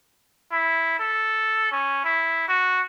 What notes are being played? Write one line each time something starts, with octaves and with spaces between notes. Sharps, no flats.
E4
A4
C#4
E4
F#4